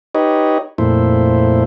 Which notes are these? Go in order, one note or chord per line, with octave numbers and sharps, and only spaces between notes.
D#4 G4 B4 C#5 D#5
F2 A#2 A3 E4 C5